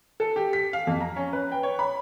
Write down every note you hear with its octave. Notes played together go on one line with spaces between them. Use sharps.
A4
G4
B6
F5
F2
A#5
C#4
B4
G5
C#5
B5